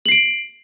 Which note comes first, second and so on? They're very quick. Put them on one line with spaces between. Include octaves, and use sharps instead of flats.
F#7 C7 D7